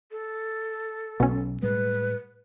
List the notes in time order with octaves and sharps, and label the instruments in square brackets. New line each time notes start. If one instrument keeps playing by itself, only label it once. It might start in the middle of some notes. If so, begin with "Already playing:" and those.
[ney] A4
[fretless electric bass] B1 [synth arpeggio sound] B2 C#4
[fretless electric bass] A2 G3 G#3 [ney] B4